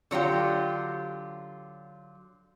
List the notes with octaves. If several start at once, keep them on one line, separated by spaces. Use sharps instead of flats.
D3 F#3 F4 G4